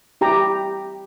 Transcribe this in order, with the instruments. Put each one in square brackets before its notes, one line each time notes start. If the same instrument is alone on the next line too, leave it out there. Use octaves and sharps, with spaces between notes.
[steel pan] E4 G4 A#5